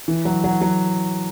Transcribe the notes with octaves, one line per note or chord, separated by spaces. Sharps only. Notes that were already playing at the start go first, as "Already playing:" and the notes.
E3
F#3
F#3
F#3